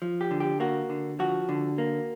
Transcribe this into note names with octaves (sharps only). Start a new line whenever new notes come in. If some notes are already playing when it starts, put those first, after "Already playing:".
F3
G4
D3
G4
A#3 F#4
D3
F3 F#4
D3
A#3